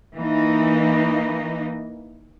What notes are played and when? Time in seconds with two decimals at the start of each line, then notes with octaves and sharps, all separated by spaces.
0.14 E3 A#3 D#4